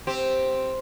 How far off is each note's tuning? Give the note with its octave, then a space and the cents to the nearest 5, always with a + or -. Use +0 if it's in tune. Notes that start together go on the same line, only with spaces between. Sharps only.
C4 +0 G4 +0 C5 +0